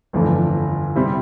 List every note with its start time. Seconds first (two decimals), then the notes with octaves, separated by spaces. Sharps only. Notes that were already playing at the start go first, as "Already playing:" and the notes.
0.13 G1 F2 E3 A3 D4
0.96 C3 G3 C4 E4